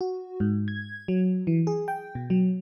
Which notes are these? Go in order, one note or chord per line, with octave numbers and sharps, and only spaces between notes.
F#4
G#2
G#6
F#3
E3
G#4
G5
B2
F#3